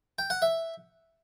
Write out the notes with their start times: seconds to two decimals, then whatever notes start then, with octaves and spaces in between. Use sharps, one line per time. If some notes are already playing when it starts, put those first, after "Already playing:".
0.19 G5
0.30 F#5
0.42 E5